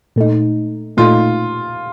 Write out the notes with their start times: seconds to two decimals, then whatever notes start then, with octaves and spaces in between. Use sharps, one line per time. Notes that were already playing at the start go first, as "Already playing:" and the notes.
0.16 A#2 A3 D#4
0.97 A#2 A3 D#4 F4